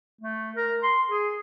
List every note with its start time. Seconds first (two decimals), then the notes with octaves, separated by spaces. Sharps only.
0.21 A3
0.56 A#4
0.83 C6
1.10 G#4